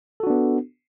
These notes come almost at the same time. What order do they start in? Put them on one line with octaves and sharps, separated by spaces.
A4 F#4 D4 B3